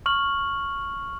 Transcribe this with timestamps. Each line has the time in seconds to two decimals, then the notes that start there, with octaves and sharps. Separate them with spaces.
0.06 C#6 F6 F#7